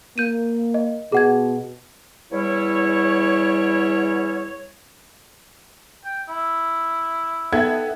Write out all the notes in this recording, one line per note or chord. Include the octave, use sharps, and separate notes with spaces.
A#3 G6 D#7
D#5
B2 G#4 F#5 G#6
E2 G3 E4 C#5
G5
E4
B3 D#4 A4 E5 G5 G#6